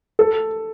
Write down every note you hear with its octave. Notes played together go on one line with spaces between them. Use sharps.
A4